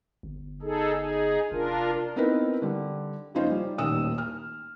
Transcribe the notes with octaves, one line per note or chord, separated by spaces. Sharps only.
G1
D#4 G#4 A4
D#4 G#4
F1 D4 F4 A#4
B3 C4 D#4 E4 A#4 B4
D3 G3
F#1 F3 C#4 D#4 F4 C5
G3
D#1 A1 D#3 D#6 E6 E7
F6